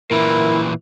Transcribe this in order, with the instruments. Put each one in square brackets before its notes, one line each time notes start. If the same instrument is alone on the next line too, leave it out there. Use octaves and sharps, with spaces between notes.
[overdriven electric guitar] A#2 E3 [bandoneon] E4 [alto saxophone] A#4